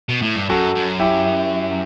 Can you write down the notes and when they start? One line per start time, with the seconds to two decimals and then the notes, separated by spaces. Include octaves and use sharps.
0.09 B2
0.22 A2
0.36 G2
0.49 F#2 F#4 A4
0.75 F#2
0.99 E4 G4